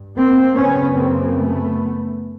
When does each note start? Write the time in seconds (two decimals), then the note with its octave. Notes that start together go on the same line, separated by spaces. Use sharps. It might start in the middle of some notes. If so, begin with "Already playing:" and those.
Already playing: G2
0.18 A#3 C4
0.56 F#2 C#3 B3 C#4
0.95 A#3 C4
1.34 A3 B3